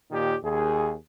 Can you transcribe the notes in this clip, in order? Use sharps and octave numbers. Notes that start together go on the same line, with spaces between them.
D#2 A#2 D#3 G4
D#2 G#4